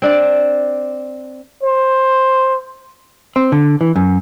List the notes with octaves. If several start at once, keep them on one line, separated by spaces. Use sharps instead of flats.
C4 D4 D5
C5
C4
D3
E3
F#2